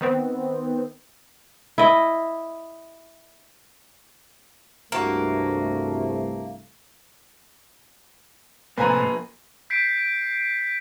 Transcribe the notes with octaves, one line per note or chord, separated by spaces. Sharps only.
D#3 B3 C4
E4 D#5
C2 G2 A3 A#3 F#4 A#4
A2 C3 F3 A#3 B4 G#5 A#5
G6 B6 C7 D7